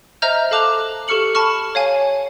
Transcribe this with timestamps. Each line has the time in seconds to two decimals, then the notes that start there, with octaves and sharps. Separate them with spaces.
0.22 C5 D#5 E5 A#5 F6 G6
0.51 A4 F5 A5 D6 F#6 F7
1.08 G4 A4 C#6 F6 C#7 F#7
1.35 A5 B5 C#6 F6
1.75 C#5 F5 G#5